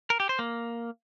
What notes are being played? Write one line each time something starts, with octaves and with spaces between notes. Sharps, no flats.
A#4
G4
C5
A#3